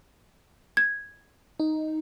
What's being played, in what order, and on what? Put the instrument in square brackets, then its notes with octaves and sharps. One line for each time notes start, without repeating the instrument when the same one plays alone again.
[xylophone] G#6
[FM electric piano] D#4